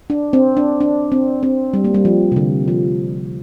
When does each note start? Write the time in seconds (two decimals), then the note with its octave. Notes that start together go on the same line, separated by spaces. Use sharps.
0.10 D4
0.33 C4
0.57 D4
0.80 D4
1.12 C4
1.43 C4
1.74 G3
1.84 A#3
1.94 G3
2.05 F3
2.32 C3
2.36 D3
2.68 F3